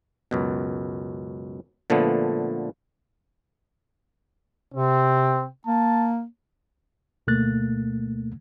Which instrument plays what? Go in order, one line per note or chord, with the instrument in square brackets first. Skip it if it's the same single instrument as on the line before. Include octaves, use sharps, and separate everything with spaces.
[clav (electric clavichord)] C#2 F#2 B2
A#2 D3 F3 A3 B3
[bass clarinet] C3 [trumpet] C4
[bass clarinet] A#3 [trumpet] A5
[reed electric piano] D2 B2 A3 A#3 F#6 A6